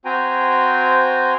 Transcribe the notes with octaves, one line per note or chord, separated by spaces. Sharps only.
C4 F#4 C5 G5 G#5 A#5